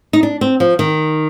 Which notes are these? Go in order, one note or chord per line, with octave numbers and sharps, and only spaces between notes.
D#4
D4
C4
F3
D#3